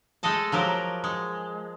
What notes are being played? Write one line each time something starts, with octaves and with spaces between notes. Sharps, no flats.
G#3 A3 A4 D#5 A5
F3 F#3 G4 A#4
G#3